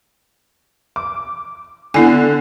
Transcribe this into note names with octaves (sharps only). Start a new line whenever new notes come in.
D6
D3 B3 E4 G#5